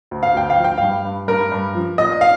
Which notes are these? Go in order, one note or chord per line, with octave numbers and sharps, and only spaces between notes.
D2
F5
D2 G5
F5
F3
G5
G2 F5
G2
G2 A#4
G2
F3
A#2 D#5
F5